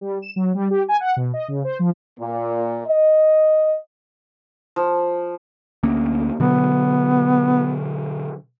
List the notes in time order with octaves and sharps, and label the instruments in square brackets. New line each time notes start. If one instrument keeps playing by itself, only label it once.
[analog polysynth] G3
E7
F#3
G3
G4
G#5
F#5
B2
D#5
C#3
C5
F3
[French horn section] A#2
D#5
[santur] F3
[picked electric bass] D2 A#3 C#4
[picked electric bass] B2 D3 F#3 [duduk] B3